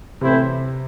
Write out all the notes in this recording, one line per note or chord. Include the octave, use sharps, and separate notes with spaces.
A2 C3 E3 C4 E4 C5